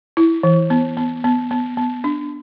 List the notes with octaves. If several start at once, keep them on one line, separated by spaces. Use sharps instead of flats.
E4
E3
B3
B3
B3
B3
B3
D4